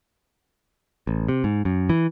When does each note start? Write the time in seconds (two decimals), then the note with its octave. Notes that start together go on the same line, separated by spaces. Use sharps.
1.07 A1
1.29 C3
1.44 G#2
1.65 F#2
1.89 E3